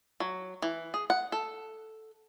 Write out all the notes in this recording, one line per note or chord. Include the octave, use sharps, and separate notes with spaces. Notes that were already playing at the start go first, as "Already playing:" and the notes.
F#3
E3
G#4
F#5
A4